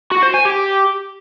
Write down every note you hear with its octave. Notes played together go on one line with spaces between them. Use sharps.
F#4
C5
G#5
G4